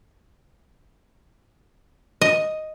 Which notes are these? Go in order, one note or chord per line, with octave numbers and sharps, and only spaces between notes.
D#5